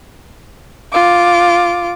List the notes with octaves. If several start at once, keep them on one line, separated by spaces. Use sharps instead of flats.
F4 D6